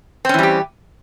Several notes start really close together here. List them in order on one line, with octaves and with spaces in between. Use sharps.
C4 C#4 E3 G3 G4